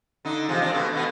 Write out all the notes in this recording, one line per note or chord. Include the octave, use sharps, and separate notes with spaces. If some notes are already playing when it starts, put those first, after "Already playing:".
D3 D#4
C3 F3 G#3
G#3 C4 D4
B2 A3
B2 A3 B3